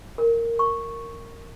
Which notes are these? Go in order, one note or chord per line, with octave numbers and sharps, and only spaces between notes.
A#4
C#6